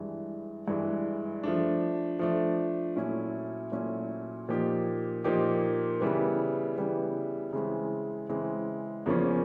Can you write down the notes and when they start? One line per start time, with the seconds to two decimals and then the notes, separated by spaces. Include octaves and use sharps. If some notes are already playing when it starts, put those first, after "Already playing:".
Already playing: G2 E3 G#3
0.68 G2 E3 G#3
1.44 F3 A3 D4
2.19 F3 A3 D4
2.96 A#2 F#3 A3 C#4 E4
3.72 A#2 F#3 A3 C#4 E4
4.48 A#2 F3 A#3 D#4 G4
5.24 A#2 F3 A#3 D#4 G4
6.01 C#3 E3 G3 B3
6.77 C#3 E3 G3 B3
7.53 C#3 E3 G#3 C4
8.29 C#3 E3 G#3 C4
9.06 E2 C#3 F3 A#3 C#4